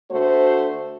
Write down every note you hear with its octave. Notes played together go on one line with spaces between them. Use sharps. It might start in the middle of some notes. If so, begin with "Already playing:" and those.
D2 A3 F#4 C5